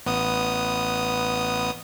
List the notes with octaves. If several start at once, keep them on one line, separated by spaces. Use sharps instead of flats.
A1 B3 D#6